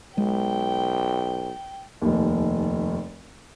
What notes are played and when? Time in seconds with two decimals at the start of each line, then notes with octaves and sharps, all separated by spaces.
0.18 B1 G#3 G5
2.02 F1 D#2